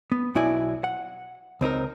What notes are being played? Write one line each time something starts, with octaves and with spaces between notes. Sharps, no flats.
B3
B1 B2 E4 F#4 D5 G#5
F#5
C#2 C4 D#4 A#4